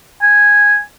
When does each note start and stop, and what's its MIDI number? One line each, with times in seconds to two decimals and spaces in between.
0.22 0.81 80